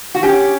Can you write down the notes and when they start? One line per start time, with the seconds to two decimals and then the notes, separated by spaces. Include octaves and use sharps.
0.15 F#4
0.23 C#4 G4